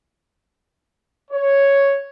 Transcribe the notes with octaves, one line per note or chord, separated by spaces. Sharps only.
C#5